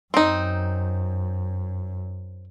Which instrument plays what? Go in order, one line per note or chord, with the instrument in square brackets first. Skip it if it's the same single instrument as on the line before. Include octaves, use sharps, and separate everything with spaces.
[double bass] F#2 [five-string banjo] C4 D#4